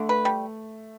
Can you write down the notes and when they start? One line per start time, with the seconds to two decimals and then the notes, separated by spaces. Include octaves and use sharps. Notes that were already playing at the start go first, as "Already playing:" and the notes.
Already playing: D3 A3
0.09 B4
0.25 G3